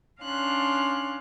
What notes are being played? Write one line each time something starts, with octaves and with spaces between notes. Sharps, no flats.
C#4 D4 F5 C6 F#6